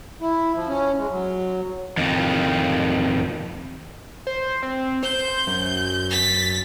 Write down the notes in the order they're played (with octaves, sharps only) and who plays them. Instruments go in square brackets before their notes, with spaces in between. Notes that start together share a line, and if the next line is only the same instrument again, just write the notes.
[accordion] E4
F3
C#4
G#3
F#3
[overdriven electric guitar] F2 D#3
[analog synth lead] C5
C4
[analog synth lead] C5 [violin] G6
[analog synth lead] F#2
[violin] A6 B6